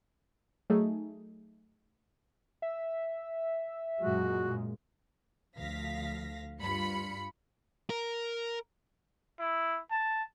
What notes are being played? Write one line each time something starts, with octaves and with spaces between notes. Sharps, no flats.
F#3 A3 D#4 G#4
E5
F#2 A#2 G#3 F#4
D2 F3 F5 A#6 B6
G2 F4 B5 C#7
A#4
E4
A5